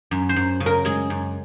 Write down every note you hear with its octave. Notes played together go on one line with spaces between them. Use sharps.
F#2
C5
F#2
C#3
A#4
G#3 G#4
F#2